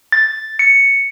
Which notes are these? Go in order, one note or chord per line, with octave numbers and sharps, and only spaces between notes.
A6
C#7